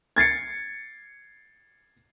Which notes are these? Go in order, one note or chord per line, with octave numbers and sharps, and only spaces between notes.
G#6 A6 C7 C#7